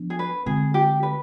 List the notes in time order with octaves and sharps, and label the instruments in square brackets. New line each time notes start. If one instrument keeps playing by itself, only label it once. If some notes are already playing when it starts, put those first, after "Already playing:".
Already playing: [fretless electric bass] F3 B3 D4
[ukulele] G#4
B4
[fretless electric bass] D3 G#3 C4 [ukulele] G#4
[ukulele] G4
B4